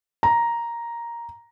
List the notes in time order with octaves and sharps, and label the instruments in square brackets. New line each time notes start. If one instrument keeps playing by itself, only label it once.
[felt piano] A#5